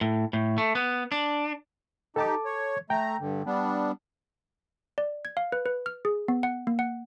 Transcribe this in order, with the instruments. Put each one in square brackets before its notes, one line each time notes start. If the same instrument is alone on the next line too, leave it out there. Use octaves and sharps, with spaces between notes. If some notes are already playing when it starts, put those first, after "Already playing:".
[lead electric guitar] A2
A2
A3
B3
D4
[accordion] D#4 G4 [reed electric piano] A4 A5 D6
[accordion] C#5
[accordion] A3 A#5 [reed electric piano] G5
[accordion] G2 D3
G3 B3 D4
[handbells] D5
G#6
F5
B4
B4
F6
G#4
B3
F#5
A#3
F#5